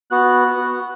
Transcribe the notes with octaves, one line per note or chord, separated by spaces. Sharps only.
B3 F#4 F#6
B3 F#4